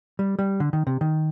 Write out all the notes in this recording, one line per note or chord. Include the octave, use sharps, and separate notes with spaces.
G3
G3
D3
D#3
C3
D#3